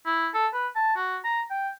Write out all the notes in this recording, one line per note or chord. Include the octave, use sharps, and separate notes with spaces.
E4
A4
B4
A5
F#4
A#5
G5